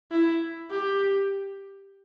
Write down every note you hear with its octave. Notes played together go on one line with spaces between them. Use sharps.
E4
G4